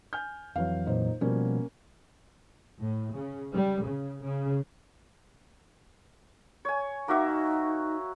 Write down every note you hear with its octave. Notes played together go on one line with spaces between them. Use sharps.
G#5 F6 G6
F2 E3 F#3 F5
A#2 D#4 C5
B2 F3 G3 A#3 C#4
A2
C#3
G3
C#3
C#3
C#5 G#5
A#3 D#4 F#4 E5